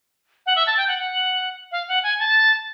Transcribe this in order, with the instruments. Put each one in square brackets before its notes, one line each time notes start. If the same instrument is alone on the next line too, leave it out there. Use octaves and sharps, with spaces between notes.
[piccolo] F#5
E5
A5
G5
F#5
F#5
F5
F#5
G#5
A5